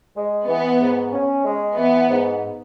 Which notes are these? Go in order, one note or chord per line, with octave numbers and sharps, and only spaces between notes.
G#3
E3 B3
G#2
C#4
G#3
E3 B3
G#2